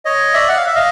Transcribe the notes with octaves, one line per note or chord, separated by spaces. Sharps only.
C#5 D#5
D5 E5
F#5
F5
E5
D#5 F5